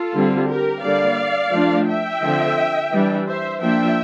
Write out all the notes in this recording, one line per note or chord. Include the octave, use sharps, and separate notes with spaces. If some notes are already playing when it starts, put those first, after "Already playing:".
Already playing: F4 A4
D3 G3 C4
G4 A#4
D3 G3 A#3 D5 F5
F3 A3 D4
E5 G5
D3 F3 C4
E3 G3 D4
C5 E5
F3 A#3 D4 E5 G5